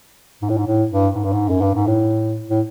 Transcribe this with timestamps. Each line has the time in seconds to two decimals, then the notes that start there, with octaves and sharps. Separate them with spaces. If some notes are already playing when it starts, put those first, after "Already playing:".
0.42 G#2
0.50 A2
0.58 G#2
0.67 A2
0.91 G2
1.15 G#2
1.24 G2
1.32 G#2
1.49 F#2
1.62 G2
1.75 G#2
1.87 A2
2.50 A2